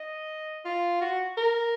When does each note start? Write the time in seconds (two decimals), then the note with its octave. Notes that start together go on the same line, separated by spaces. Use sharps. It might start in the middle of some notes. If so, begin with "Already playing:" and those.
Already playing: D#5
0.65 F4
1.01 F#4
1.37 A#4